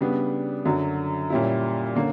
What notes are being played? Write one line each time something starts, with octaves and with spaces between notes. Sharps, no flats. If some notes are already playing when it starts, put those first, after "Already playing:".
C#3 G3 B3 D4
F#2 D3 F#3
A#2 G3 C#4 E4
D3 A#3 C#4